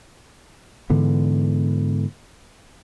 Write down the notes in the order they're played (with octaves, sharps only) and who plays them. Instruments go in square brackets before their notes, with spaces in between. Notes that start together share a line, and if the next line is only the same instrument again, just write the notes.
[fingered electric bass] G#2 D3 E3 B3